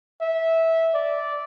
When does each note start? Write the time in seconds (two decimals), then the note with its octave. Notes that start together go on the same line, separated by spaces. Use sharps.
0.21 E5
0.94 D5